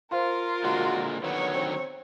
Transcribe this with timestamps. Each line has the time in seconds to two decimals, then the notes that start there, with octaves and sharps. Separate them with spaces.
0.12 F4 A#4 C5 F5 C6
0.64 A#2 D3 G#3 F#4
1.24 D3 D#3 F#3 B3 C#5
1.54 C4